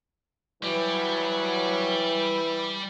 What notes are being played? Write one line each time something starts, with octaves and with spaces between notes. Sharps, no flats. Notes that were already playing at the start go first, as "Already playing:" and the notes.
E3 F#3 G3 C#5